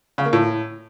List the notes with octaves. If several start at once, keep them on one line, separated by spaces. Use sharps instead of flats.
C#3
A#3
A2